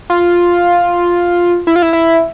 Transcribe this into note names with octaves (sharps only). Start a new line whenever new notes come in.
F4
E4
F4
E4
E4